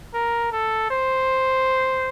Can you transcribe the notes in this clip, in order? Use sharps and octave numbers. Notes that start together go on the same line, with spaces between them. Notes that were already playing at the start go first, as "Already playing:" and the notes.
A#4
A4
C5